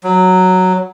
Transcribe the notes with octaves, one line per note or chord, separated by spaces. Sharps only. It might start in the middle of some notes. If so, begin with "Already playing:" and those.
F#3